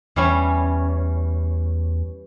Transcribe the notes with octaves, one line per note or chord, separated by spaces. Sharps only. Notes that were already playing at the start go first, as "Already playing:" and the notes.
E2 E3 G3 C#4